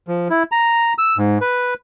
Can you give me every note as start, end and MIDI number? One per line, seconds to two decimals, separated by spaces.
0.08 0.28 53
0.30 0.43 64
0.52 0.93 82
0.98 1.17 88
1.18 1.38 44
1.41 1.74 71